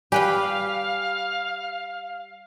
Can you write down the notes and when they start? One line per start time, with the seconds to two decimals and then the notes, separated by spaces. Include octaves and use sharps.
0.12 G3 G4 B4 F5 G5 G#5 B5